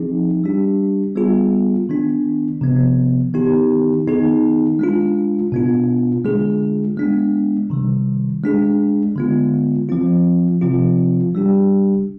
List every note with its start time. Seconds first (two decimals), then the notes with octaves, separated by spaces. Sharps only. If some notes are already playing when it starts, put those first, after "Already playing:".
Already playing: F3 C4 D#4 G#4
0.44 G3 D4 G4
1.16 G3 B3 F4 G#4
1.89 D#3 B3 D4
2.61 C3 F3 B3
3.34 D#3 B3 D#4 G4
4.07 D#3 B3 D#4 G#4
4.79 G#3 D4 F4
5.52 B2 B3 D4 F4
6.25 D3 G#3 D4 F4 G#4
6.97 G#3 B3 D4
7.70 C3 D#3 G3
8.44 G#3 D4 G#4
9.16 D3 G#3 B3 F4
9.89 F3 C4 F4
10.61 C3 F3 C4 F4
11.35 G3 D4 G4